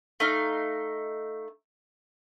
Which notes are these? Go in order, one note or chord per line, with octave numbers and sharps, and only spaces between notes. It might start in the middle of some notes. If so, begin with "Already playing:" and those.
A3 D#4 F5